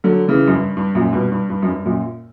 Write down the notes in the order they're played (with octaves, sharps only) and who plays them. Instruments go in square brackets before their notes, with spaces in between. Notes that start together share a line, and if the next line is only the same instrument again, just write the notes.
[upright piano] D3 F#3
C#3 E3
F#2
G2
G2
F#2 A#2
G2 B2
G2
G2
F#2
G2
F#2 A#2